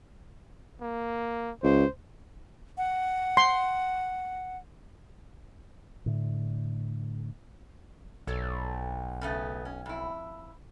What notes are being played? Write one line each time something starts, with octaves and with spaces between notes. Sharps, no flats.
A#3
C#2 C5
F#5
C6
A2 D3
B1 A4 C#5 D5
C#3 A3 B3
C#4
F2 E4